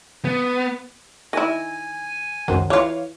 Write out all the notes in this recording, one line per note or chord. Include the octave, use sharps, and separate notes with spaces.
B3
D#3 E4 G#5 A#6
C#2 F#2 D#3 F#3 C5
E3 F4 C#5 F5